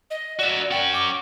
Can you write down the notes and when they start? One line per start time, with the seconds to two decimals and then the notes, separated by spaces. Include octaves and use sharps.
0.11 D#5
0.39 F#4 D5 E5
0.71 C#4 F#5 G5
0.94 D6